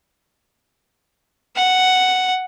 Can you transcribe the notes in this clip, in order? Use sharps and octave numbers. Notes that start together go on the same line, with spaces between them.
F#5